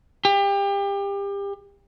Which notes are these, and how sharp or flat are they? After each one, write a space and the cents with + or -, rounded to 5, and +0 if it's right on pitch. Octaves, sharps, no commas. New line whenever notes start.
G4 +30